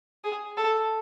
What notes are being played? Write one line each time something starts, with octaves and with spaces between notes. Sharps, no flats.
G#4
A4